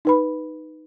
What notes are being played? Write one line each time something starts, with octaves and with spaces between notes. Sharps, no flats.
D#4 B4 B5